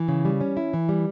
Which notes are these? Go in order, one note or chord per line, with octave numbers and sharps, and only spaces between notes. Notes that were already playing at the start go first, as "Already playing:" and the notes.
Already playing: E3
C#3
G3
C#4
E4
E3
G3